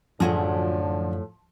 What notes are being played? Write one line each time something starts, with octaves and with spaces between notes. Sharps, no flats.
F#2 A2 D3 F3 F#4 G#4